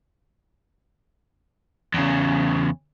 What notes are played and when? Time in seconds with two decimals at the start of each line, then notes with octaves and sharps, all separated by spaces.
1.94 E2 C#3